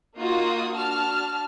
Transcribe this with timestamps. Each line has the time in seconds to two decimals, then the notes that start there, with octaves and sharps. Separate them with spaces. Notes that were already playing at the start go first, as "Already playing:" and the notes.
0.17 A#3 D#4 F4 F#4 D#6
0.76 D4 F#4 A5 F6